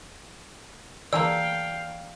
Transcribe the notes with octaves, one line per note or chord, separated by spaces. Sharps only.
E3 G#3 A#3 D5 F5 G5 A5 E6